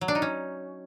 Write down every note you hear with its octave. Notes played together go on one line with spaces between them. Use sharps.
F#3
D4
D#4
C#4